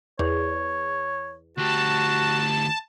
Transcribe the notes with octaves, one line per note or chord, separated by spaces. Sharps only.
E2 C#5
D2 F#4 G4 A5